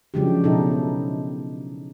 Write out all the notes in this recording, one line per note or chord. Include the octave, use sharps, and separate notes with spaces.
C#3 F3 F#3 G#3 D4 G4
B2 D#4 E4 A4